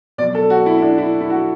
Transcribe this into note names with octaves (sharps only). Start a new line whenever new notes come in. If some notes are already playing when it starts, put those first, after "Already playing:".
B2 F#3 D5
A4
F#4
E4
E4
D4
E4
E4
F#4